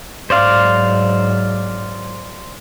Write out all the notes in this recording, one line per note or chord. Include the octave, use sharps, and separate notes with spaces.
G#2 F#3 C5 D5 F5